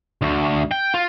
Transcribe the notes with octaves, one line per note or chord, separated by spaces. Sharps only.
D2
G5
F4